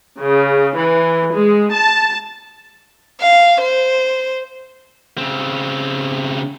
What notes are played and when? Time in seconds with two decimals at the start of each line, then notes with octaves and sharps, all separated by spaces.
0.18 C#3
0.76 E3
1.32 G#3
1.71 A5
3.21 F5
3.61 C5
5.18 C#3 C4